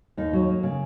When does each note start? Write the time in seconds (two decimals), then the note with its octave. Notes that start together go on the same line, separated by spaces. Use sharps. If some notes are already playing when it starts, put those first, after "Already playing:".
0.17 D#2 D#4
0.33 F#3
0.48 A#3
0.63 C#3